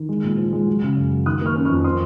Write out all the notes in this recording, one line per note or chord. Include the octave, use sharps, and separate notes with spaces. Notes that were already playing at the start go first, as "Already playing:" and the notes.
Already playing: D#3
G#3
A#2
F3
G#3
F#3
C#3
F#2
F#3
D#3 D#6 F#6
A#3 C#6 F6
C#4
F2 C#6 F6
C4 C6 D#6